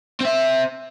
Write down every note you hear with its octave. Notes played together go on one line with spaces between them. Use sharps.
C4 E5